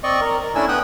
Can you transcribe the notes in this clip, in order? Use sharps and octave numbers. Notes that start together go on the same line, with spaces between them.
C4 D5 D#5 C#6
A#4
A#4
A3 C#4 D4 E4 G#5 E6
B3 G5 D#6 F#6